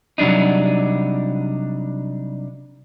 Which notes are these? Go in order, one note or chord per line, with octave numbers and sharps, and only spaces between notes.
C3 F#3 G3 D4 D#4